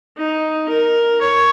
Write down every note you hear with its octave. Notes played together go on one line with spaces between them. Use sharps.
D#4
A#4
C#5